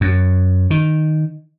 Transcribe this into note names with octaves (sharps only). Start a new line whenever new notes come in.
F#2
D#3